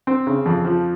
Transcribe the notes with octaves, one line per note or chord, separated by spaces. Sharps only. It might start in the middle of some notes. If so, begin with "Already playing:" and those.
C4
C#3
F2
F3